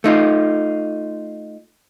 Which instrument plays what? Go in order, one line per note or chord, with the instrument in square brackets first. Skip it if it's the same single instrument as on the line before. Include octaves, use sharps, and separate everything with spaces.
[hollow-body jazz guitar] A3 D#4 F4